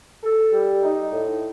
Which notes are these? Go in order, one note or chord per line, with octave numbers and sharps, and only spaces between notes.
A4
G3
D#4
A2